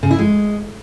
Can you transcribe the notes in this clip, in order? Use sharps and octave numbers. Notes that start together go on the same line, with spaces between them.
C#3
E4
G#3